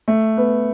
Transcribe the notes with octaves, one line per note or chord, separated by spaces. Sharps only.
A3
B3